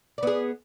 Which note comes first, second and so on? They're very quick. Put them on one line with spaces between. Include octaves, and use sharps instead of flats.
D5 B3 G#4